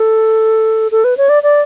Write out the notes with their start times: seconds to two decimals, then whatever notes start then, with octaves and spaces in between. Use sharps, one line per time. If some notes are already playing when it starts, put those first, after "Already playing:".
Already playing: A4
0.92 A4
1.04 B4
1.17 C#5
1.29 D5
1.43 D5